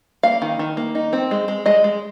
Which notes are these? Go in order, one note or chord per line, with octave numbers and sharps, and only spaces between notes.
A#3 F5
D#3
D#3
A#3
D#4
C4
G#3
G#3
G#3 D#5
G#3